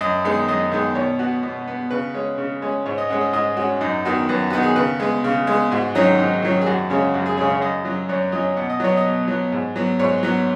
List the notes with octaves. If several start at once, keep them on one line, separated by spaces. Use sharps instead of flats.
F#2 D#5
D#3 G#3 B3
F#2 D#5
D#3 G#3 B3
B2 C#5
B3 F#4
B2
B3
C#3 B4
G#3 C#4
C#3
G#3 C#4
G#2 C#5
D#5
G#3 C#4 F#5
D#5
G#2 D#5
G#3 C#4 F#4
F#2 D#4
D#3 B3 F#4
F#2 B4
D#3 B3 F#4
G#4
C#3 B4
G#3 B3
C#3
G#3 B3
G#2 F#4
D#3 F#3 C#4 D#4
G#2 D#4
D#3 F#3 C#4
G#4
F#2 F#4
C#3 G#3 C#4
F#2 F#4
G#4
C#3 G#3 C#4 G#4
C#5
F#2 D#5
F#3 C#4
F#2 C#5
F#3 C#4 D#5
B2 F#5
D#5
F#3 B3 C#5
D#5
B2
F#3 B3
G#2
F#3 B3
G#2 C#5
F#3 B3